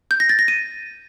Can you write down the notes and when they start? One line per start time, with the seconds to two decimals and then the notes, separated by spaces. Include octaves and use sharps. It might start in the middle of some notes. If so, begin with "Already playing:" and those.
0.11 G6
0.20 A#6
0.29 A6
0.39 A#6
0.48 D#7